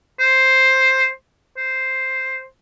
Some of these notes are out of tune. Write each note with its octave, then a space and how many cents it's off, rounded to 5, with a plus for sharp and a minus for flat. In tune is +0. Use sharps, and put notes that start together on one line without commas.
C5 +5
C5 +0